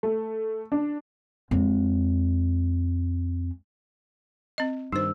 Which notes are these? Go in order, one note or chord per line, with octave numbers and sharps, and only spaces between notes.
A3
D4
F2 G#3
C4 D#5
G2 D#3 D#4 C5 E6